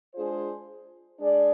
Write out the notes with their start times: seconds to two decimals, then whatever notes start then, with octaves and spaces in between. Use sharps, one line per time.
0.14 G#3 D4 F4 G#4 C5
1.19 G#3 D4 G#4 D5